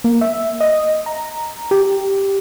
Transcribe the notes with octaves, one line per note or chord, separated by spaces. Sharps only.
A#3
E5
D#5
A#5
G4